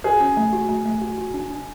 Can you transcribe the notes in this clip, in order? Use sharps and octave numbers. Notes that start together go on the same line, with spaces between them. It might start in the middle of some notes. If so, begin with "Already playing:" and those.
F#4 G#4
C#4
A3
F#4
A3
A3
F#4
F#4
D4
D4